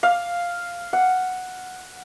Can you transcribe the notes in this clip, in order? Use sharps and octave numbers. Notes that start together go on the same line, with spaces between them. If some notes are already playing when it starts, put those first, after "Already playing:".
F5
F#5